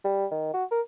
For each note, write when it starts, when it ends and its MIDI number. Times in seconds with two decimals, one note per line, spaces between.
0.04 0.26 55
0.31 0.49 51
0.54 0.64 66
0.71 0.81 70